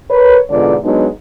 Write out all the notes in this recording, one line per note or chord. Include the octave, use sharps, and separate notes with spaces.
A#4 B4 C#5
E2 G#2 B2 D3 F4 D5
F#3 G#3 B3 D4 D#4